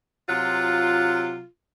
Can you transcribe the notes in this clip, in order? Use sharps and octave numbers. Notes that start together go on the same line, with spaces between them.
C3 F#3 F4